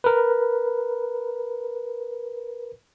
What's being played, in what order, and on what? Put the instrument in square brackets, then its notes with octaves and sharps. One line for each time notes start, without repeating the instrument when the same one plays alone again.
[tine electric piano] A#4 B4